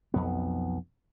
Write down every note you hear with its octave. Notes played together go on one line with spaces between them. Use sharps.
B1 F2 B3